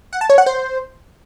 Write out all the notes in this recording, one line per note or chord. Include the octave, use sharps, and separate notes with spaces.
F#5
A5
C#5
F#5
C5